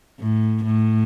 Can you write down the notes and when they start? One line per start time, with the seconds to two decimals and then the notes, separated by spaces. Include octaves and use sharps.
0.19 A2
0.64 A2